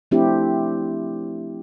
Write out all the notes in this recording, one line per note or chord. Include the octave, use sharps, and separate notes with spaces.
F3 A3 C4 D4 E4 G4